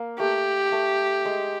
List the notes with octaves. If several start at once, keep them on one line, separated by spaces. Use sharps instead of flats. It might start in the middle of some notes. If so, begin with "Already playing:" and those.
Already playing: A#3
A3 G4
A3
G#3